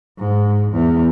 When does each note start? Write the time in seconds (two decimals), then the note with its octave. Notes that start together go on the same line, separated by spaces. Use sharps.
0.18 G#2
0.72 E2